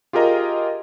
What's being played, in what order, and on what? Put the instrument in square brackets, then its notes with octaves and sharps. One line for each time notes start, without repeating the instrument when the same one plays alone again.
[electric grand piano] F4 G4 G#4 A#4 D#5 A#5